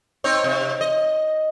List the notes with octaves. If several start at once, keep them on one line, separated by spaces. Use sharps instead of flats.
C4 D#4 C#5
C3
D#5